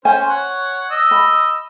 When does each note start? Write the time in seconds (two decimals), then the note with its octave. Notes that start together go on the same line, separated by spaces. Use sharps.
0.05 C#4 C5 G#5
0.29 C#5 F#5
0.91 D#5 E6
1.11 B5